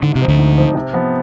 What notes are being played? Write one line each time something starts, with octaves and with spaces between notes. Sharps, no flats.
G#2 D3
C3
F3 C4 D#4
D2 D3
G#2
F3 C4 D#4
C3
F3 B3